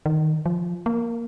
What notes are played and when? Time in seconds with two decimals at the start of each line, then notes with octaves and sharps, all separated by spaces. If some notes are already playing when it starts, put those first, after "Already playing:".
0.06 D#3
0.46 F3
0.86 A#3